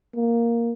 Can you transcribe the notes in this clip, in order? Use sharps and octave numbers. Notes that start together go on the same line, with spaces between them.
A#3